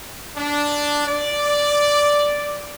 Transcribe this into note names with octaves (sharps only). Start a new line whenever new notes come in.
D4
D5